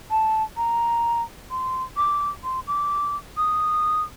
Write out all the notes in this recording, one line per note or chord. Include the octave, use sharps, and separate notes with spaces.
A5
A#5
C6
D6
C6
D6
D#6